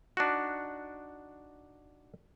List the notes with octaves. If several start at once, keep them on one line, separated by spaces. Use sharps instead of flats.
D4 D#4 F#4